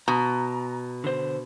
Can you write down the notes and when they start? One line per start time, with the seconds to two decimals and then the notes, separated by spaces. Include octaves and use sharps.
0.08 B2 A#5
1.04 D3 C5